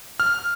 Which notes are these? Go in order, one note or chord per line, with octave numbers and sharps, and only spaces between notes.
F6